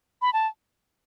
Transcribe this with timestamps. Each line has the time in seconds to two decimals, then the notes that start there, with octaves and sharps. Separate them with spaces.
0.22 B5
0.33 A5